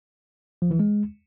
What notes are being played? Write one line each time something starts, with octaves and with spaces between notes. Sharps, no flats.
F3
E3
G#3